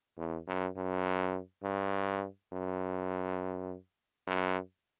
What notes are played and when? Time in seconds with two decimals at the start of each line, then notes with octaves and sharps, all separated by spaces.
0.18 E2
0.48 F#2
0.77 F#2
1.63 G2
2.52 F#2
4.27 F#2